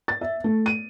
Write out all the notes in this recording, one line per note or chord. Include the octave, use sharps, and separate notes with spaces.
A6
E5
A3
D#7